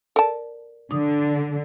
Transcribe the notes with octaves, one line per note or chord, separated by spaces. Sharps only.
A4 A#4 D5 A5
D3 D4 D#6